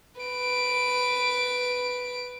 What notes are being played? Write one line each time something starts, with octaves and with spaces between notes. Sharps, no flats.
B4 D7